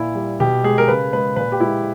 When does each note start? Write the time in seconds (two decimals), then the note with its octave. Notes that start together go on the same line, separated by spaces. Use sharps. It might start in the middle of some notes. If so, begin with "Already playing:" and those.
Already playing: A#2 E4
0.15 G3
0.40 B2 G4
0.64 G#3 G#4
0.78 A#4
0.88 C#3 B4
1.13 G#3 B4
1.36 A#2 B4
1.52 G4
1.60 G#3 E4